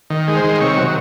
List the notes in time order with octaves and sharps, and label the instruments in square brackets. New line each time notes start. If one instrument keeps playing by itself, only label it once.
[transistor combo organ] D#3
G#3
C5
D#3
C3 C#5
F#3